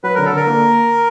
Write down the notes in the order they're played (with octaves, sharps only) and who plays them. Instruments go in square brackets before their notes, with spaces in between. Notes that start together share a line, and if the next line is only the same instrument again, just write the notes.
[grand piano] F#3 [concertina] B4
[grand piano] D3 [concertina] A#4
[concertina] A4
[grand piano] D3 [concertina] A#4
[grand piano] A#3